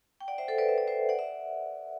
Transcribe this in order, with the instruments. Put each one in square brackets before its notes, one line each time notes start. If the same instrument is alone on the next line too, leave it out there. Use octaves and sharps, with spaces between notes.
[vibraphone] G5
D5 F#5
C5 E5
A4 C5
B4 D5
E5
D5
C5 E5
D5 F#5
E5